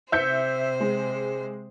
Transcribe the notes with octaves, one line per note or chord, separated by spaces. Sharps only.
C3 C5 E5 G6 C#7
G#3